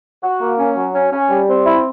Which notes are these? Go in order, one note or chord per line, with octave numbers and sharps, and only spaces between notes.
F#4
A#3
C#4
F#3
C#4
C#4
G3
C4
E4